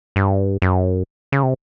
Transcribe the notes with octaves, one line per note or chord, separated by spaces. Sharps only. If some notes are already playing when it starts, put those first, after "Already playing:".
G2
F#2
C#3
C3